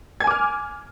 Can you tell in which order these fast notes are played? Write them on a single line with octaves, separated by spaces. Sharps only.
G#6 G#5 D6 F6